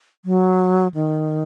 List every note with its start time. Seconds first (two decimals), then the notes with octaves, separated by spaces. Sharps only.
0.25 F#3
0.94 D#3